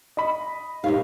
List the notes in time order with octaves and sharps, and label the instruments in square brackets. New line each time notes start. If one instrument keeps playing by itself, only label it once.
[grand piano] D#5 B5
[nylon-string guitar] A#2 C#5 F5 [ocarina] D#4 [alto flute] G4